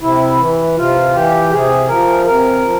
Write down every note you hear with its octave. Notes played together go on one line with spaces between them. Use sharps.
C3 E4
E3
C3 F4
E3 G4
C3 G#4
F3 A#4
C3 A#4
F3